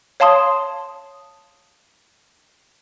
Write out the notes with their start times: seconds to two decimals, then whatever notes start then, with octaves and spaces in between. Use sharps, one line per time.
0.20 C#5 F5 A5 C6 D#6